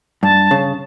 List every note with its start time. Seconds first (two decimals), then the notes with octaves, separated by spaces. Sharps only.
0.23 G2 A5
0.51 C#3